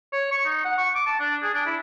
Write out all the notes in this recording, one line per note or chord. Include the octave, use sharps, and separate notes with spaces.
C#5
C#6
D#4
F#5
C#6
D6
A5
D4
G#4
D4
E4